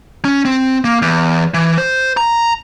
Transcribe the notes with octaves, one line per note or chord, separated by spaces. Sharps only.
C#4
C4
A#3
E2
E3
C5
A#5